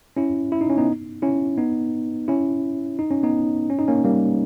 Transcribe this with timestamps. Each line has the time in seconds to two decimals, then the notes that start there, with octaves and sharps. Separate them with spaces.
0.17 C#4 E4
0.52 E4
0.61 D#4
0.69 C#4
0.78 B3 D#4
1.22 C#4 E4
1.58 B3 D#4
2.28 C#4 E4
2.99 D#4
3.11 C#4
3.23 B3 D#4
3.70 C#4
3.79 D#4
3.88 A#3 C#4
4.04 G3 A#3